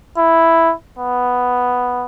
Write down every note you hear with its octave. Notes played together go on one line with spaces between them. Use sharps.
E4
B3